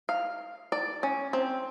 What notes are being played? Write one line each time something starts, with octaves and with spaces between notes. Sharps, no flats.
F5
D5
C#4
C4